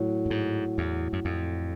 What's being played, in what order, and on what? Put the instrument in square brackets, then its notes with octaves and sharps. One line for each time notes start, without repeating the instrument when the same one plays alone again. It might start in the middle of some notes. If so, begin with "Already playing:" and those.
Already playing: [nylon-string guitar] A2 F#3
[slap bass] G2
G#2
E2
F#2
F2